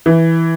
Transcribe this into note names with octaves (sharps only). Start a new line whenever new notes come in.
E3